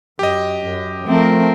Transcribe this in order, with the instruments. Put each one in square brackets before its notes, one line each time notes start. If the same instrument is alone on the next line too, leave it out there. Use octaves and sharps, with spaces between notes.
[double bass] F#2 [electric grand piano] G4 D#5
[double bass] F#2
[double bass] F3 [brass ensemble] A3 [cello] C4 A#4